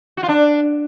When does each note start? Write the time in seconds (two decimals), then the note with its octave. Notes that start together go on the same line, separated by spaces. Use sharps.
0.17 F#4
0.23 F4
0.29 D4